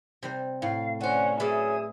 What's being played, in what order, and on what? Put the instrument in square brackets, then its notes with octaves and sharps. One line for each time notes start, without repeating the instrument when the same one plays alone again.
[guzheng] C3 G3 C5
[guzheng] A2 [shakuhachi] F5
[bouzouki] D3 C5 [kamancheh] C#4 [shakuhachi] F#5
[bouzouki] F#3 C#4 [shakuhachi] G#4 [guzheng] B4 D5 F5 [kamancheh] E5 D#6